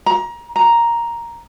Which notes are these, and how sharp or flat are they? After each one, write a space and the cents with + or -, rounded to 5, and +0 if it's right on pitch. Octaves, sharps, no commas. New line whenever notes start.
A#5 +25
A#5 +5